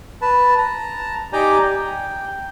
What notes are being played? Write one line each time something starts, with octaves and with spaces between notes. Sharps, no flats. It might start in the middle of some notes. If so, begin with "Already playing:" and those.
B4 A5
A5 A#5
D#4 G4 D5 G5 G#5 A#5
G5